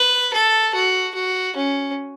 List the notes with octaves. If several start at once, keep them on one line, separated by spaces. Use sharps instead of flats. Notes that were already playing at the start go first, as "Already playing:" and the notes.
Already playing: B4
A4
F#4
F#4
C#4